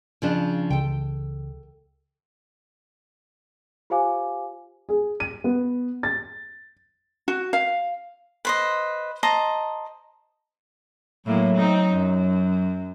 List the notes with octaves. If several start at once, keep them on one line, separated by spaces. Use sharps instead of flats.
C#3 F3 D4
C#2 C#3 E3 A4 G5
F4 G4 C5 F5 G#5 D6
G#4
D#7
B3
A6
F#4
F5
B4 C5 D#5
C5 D#5 A5 A#5
A2 F#3 A#3
C4 D#4
F#2